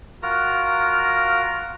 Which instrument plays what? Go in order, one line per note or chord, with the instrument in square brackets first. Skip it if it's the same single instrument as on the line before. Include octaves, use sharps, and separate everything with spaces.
[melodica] F4 F#4 A#4 A#5